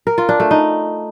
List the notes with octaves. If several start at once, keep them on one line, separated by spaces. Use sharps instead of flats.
A#4
F4
D4
A3
D#4